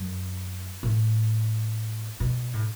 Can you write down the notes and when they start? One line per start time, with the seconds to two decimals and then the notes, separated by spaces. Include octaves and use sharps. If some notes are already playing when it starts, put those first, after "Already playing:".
Already playing: F#2
0.83 A2
2.20 B2
2.53 A2